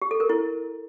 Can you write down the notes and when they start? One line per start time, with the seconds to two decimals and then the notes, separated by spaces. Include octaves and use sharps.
0.02 G4
0.11 A4
0.20 A#4
0.29 E4